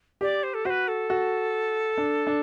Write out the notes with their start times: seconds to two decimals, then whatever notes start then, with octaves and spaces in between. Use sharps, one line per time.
0.21 G4 D5
0.43 C5
0.54 A4
0.65 F#4 C5
0.70 B4
0.88 A4
1.10 F#4
1.98 D4
2.27 D4